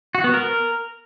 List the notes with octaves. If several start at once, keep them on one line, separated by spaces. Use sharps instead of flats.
F#4
B3
A#4